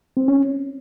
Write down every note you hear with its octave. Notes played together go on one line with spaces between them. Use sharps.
C4
C#4